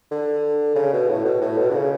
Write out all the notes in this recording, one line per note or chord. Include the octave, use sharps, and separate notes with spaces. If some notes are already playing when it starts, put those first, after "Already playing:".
D3
C#3
B2
A2
B2
A2
B2
D3
C#3